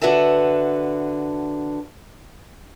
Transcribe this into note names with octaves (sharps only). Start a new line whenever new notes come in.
D3 F#4 B4 E5 A5